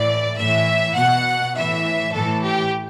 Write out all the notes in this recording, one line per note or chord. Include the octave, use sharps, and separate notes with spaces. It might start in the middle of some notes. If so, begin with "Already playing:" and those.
Already playing: A2 E3 D5
A2 E3 E5
B2 F#5
A2 E3 E5
A2 E3 A4
G4